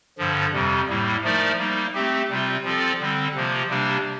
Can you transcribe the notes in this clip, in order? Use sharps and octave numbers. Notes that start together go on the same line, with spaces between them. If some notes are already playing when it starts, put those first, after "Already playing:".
G2 D3 F3
F2 C3 G3
A2 G3 A#3
F3 A3 D#4 A#4 D5
G3 A#3 D#4
A3 C4 G4
C3 G3 C4 F4
F3 C4 F4 A4 D5
D3 G3 C4
C3 F3 A#3 F4
C3 G3 A#3 D4